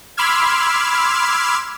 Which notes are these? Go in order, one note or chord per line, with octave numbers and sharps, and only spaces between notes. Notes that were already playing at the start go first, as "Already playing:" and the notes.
B5 C6 D6 E6 F6 G#6